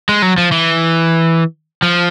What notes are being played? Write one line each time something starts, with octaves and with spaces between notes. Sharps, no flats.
G#3
F#3
F3
E3
F3